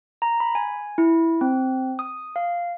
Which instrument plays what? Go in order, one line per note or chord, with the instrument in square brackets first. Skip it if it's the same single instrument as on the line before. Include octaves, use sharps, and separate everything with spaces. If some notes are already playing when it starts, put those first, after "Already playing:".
[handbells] A#5
B5
G#5
E4
C4
D#6
F5